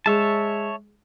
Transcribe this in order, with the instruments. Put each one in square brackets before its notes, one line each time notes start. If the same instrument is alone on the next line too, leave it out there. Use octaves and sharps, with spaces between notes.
[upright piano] G#3 [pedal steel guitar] C#5 E5 A5